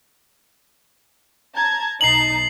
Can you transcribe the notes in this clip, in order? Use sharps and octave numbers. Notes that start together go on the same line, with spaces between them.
A5 A#5 G#6
B1 D#4 A5 C7 F#7